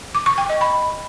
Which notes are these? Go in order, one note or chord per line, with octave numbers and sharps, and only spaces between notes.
D6
C#6
G5
D#5
B5